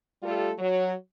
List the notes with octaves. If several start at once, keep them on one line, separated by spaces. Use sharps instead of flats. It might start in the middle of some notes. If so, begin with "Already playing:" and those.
G3 A3 F4 G4 A4
F#3